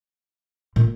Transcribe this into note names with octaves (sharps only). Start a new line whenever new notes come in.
A#2